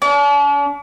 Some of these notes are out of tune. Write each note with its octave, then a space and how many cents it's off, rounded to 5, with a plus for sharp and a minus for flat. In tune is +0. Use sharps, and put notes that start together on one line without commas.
D4 -45